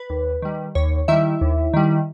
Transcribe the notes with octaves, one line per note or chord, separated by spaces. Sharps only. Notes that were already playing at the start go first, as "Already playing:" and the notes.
Already playing: B4
D#2
D#3 G3
D#2 C#5
D#3 G3 E4 E5
D#2
D#3 G3